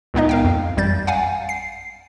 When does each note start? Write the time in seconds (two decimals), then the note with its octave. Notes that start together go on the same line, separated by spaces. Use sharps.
0.14 C#2 A#2 B3 D#4 D#5
0.29 A#4 F5 G5
0.45 F2
0.77 A1 F#2 G3 G6 A6
1.07 F5 F#5 G#5
1.49 C7